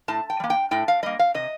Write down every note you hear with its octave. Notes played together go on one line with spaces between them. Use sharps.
A2 A5
G5
G3
A#3
G5
A2 G5
F5
G3 A#3 D#5
F5
C3 D#5